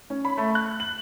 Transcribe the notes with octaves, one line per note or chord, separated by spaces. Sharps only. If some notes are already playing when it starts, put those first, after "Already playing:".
C#4
B5
A3
F#6
F#7